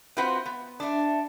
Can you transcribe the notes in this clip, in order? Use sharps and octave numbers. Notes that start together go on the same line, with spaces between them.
C4 F4 F#4 B4 C5 F#5
B3
A3 D4